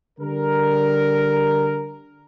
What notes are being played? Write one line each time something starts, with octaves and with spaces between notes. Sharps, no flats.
D3 G3 A#4